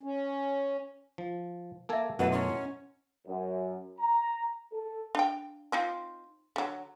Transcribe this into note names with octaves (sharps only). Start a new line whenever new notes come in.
C#4
F3
A#3 A4 E5 G#5 A5
F#2 B2 A3 E4 B4 D#5 F#5
C#4 E4 A#5 C6
F#2
A#5
A4
D4 G5
C4 D#4 F4
D3 F#3